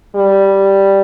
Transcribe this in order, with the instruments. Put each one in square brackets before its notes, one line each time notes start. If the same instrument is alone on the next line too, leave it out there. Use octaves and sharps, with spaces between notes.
[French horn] G3